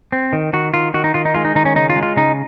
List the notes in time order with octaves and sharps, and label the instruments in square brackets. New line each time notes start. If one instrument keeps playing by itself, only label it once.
[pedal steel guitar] C4
D#3
D#3 F#4
D#3 F4
D#3 F#4
D#4
D#3 F4
D#4
G#3 F4
D#4
D#3 D#4
C#4
C#3 D#4
F4
G#3
F4
C#3 D#4